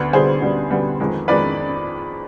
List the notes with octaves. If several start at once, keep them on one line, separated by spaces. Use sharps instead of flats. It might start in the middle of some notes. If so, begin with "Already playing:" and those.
Already playing: D2 D3 B3
D2 D3 G3 B3 G#4 C5
D2 D3 G3 B3
D2 D3 G3 B3
F2 D#3 G#3 B3
F2 D#3 G#3 B3 B4 D5